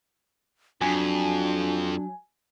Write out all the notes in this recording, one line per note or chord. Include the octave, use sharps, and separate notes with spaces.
F2 F#3 D4 G#5